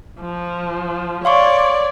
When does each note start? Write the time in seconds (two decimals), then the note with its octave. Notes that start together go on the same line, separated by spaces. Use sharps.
0.21 F3
1.25 C#5 D5 F5 C6 C#6